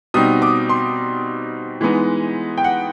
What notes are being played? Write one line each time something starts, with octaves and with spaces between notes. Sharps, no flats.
B2 G3 C4 D#4 D#6
D6
C6
E3 G#3 B3 D#4
G5
F#5